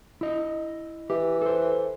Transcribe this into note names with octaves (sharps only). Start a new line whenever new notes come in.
E4 D#5
E3 G4
A4 C5